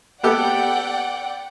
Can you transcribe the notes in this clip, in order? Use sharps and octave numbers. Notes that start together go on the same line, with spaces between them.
B3 G4 A4 D5 F#5 G5